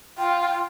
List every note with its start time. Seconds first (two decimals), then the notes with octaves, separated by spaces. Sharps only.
0.18 F4 G5
0.41 G5